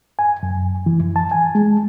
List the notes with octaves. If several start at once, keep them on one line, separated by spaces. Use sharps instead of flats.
G#5
F#2
E3
F#2
A5
G#5
G#3